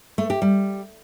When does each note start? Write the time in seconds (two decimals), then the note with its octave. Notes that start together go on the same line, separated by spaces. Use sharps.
0.18 A3
0.30 G4
0.42 G3